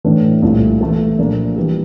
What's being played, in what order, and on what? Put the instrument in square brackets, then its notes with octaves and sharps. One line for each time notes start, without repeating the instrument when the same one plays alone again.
[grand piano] A2 E3 A3 D4
C2 A#2 A3 E4
E3 A3 E4 A4
A#2 F3 A#3 D4
E3 G3